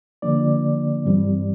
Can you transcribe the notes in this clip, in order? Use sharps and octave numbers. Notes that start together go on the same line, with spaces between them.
D3 F3 A#3 D4 D5
G2 E3 G3 C4